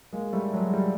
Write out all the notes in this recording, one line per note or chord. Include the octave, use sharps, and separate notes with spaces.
G#3 A#3
G3 A3
F#3 G#3
G3 A3